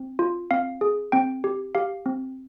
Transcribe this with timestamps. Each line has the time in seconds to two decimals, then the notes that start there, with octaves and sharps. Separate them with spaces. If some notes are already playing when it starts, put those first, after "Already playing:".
Already playing: C4
0.19 F4
0.51 C4 F5
0.81 G#4
1.12 C4 G5
1.44 G4
1.75 G4 F5
2.06 C4